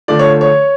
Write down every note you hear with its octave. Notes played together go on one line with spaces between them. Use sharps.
D3 F3 A3 D5
C#5
C#5